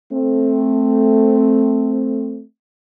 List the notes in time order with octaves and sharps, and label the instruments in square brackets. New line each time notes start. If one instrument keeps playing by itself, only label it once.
[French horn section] A3 C4